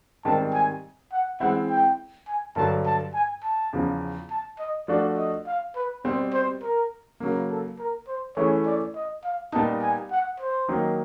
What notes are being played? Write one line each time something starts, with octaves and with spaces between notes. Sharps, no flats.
G#2 D#3 G3 C4 A5
G#5
F#5
E3 G#3 C4 E4 F#5
G5
G#5
G2 D3 F#3 A5
A5
G#5
A5
E2 C#3 F3
A5
D#5
F3 A3 D4 F#4 D5
D#5
F5
B4
B2 G3 C4 C5
C5
A#4
C#3 F#3 A#3
A4
A#4
C5
E3 A3 C#4 E4 G#4 C#5
D5
D#5
F5
A#2 G3 B3 D#4 A5
G#5
F#5
C5
D#3 F#3 A#3 D#4